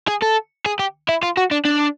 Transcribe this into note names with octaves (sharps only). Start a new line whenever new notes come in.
G#4
A4
G#4
G4
E4
F4
F#4
D4
D4